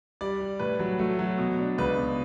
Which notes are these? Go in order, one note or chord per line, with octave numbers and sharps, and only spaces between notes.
G3 D5
G3
A2 B4
F#3
A3
F#3
B2
D4
C#2 B4
B2